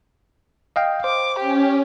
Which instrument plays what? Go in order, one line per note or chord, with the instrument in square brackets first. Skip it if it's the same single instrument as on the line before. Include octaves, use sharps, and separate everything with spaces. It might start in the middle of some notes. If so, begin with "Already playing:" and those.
[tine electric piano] D#5 F5 G5
[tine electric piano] C5 [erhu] D6
[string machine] C#4 [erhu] G4